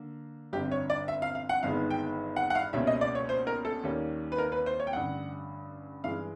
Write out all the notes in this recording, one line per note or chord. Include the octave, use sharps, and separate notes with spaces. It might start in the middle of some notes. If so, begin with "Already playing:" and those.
Already playing: D3 A#3
G1 F2 D3 G4
C#5
D5
E5
F5
F5
F#5
G1 G2 D#3 G#3 B3 F5
G5
F#5
F#5
F5
C#2 B2 G3 A#3 C#4 E5
D#5
D5
C#5
C5
A#4
A4
D#2 D#3 G3 A#3 C#4
B4
A#4
B4
C5
C#5
G5
A1 G2 D3 F#5
G2 E3 G#3 F5